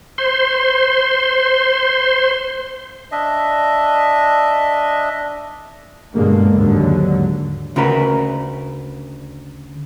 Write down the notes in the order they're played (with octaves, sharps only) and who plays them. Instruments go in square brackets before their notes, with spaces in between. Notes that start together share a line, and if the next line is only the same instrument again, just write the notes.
[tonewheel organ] C5 C6
[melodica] D4 D#5 E5
[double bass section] G2 B2 D3 G#3 A#3
D#2 G#2 D3 F#3
[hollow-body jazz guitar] D2 C#3 F#4 A#4 B4